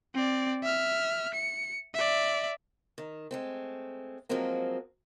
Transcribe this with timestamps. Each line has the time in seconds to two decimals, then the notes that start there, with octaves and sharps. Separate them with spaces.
0.14 C4 D5
0.63 E5 F6
1.34 C#7
1.95 D5 E5
2.98 D#3
3.31 G#3 A3 C4
4.29 F3 F#3 G#3 A#3 C4 F#4